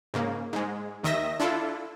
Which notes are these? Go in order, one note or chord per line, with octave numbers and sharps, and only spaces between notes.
G#2 C#3 A#3
G#2 G#3
D#2 D#3 D#5 E5 A#6
D4 E4 F4 A4